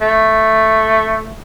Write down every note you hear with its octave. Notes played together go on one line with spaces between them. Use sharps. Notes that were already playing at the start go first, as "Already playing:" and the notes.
A3